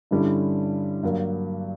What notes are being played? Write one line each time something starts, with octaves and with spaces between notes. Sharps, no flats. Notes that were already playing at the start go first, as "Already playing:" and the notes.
G2 D3 G3 C#4 E4
G2 F#3 A#3